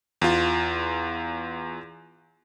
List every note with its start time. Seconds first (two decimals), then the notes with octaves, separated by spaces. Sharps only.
0.22 E2 F4